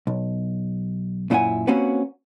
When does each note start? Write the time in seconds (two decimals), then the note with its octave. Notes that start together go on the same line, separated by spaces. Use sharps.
0.07 B1
1.30 F#2 A#2 E4 D#5 F#5 G#5
1.67 A#3 C4 C#4 F#4 G4 B4